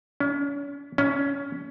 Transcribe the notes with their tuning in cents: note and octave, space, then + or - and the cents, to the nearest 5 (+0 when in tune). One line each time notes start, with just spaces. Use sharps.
C#4 +40
C#4 +20